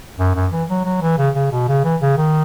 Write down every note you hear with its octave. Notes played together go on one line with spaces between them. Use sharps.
F#2
F#2
E3
F#3
F#3
E3
C#3
C#3
B2
C#3
E3
C#3
D#3